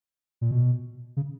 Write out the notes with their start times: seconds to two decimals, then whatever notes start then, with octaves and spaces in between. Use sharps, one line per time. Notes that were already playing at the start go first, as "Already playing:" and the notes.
0.41 A#2
0.51 B2
1.17 C#3